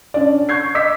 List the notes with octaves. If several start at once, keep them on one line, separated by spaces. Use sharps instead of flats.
C#4 D4 D5
C#6 G6 G#6 C7
D#5 D6 E6 B6